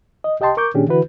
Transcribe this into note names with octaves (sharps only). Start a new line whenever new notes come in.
D#5
C2 G4 D#5 G5 A5 C6
A#4 C#6 D6 G6
A#2 D#3 C#4 D4 G4 G#4
D3 E3 E4 F#4 B4